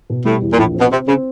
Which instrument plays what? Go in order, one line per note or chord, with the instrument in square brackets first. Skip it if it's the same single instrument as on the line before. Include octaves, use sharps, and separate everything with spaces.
[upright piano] B2
[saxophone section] A2 [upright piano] G3
[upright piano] E2
[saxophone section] A#2
[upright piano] A#1 [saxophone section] A2
[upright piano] C4
[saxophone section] B2
[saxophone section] C3 [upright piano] C4
[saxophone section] C#3 [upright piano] C4